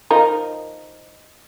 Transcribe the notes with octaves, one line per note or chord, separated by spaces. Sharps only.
F3 D#4 A#4